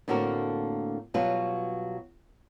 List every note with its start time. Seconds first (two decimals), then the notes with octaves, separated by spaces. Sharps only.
0.08 A2 D3 A#3 C4 F#4 A#4
1.14 B2 F#3 G3 F4 B4